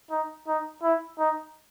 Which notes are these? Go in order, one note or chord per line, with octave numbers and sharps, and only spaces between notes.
D#4
D#4
E4
D#4